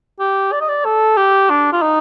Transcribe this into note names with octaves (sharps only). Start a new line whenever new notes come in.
G4
D5
D#5
D5
A4
G4
D4
F4
D#4